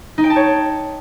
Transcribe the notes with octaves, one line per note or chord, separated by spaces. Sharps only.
D#4
G5
A5
C#5